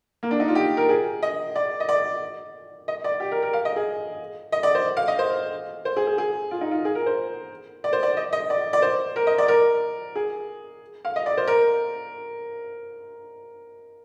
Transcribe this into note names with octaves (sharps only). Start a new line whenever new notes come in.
A#3
D4
D#4
F4
G4
A#4
G#4
D#5
D5
D#5
D5
D#5
D5
G4
A#4
A#4
F5
D#5
G#4
D#5
D5
C5
F5
D#5
C5
C5
G#4
G#4
G#4
F4
D#4
F4
G#4
A#4
C5
D5
C5
D5
D#5
D#5
D5
D5
C5
A#4
D#5
D5
A#4
G#4
F5
D#5
D5
C5
A#4